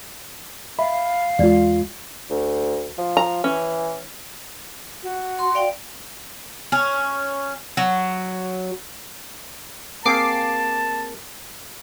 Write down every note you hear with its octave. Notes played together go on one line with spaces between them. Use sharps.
E5 F5 B5
E2 G#3 F4 D5
D2
F3
A#5
E3 C#4
F#4
C6
D5 F5 G5
C#4
F#3
A#3 C4 G#4 A5 D6 C7